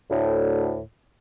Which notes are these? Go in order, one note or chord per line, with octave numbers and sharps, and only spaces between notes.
D2 A2